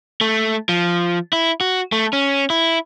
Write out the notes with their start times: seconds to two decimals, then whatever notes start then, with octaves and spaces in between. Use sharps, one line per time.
0.21 A3
0.69 F3
1.33 E4
1.61 F#4
1.92 A3
2.13 C#4
2.50 E4